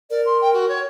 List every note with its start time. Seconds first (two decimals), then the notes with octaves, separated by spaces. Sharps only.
0.10 A#4 D5
0.26 C6
0.41 G5
0.53 F#4
0.69 C#5